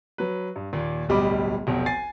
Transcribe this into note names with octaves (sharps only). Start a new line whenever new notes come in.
F#3 B4
G2
D#2 A#2
D1 B1 G3 D#5 B5 D6
F1 B1
G#5 A6 C7